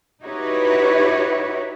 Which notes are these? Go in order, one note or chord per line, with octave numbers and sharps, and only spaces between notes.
D#4 E4 F#4 G4 B4 C#5